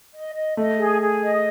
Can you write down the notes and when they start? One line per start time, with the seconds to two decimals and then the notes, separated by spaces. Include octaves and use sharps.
0.14 D#5
0.35 D#5
0.57 A3 D#5
0.78 G#4
1.01 G#4
1.22 D#5